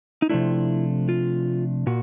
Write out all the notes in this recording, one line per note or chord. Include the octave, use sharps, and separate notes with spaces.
D#4
C3 F3 A3 D4 E4
F4
A#2 F#4